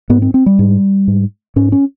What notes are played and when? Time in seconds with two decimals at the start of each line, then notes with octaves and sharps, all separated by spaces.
0.10 G#2 B3
0.22 C4
0.34 C4
0.46 G3
0.59 G#2
1.08 G#2
1.56 G#2 C#4
1.72 C#4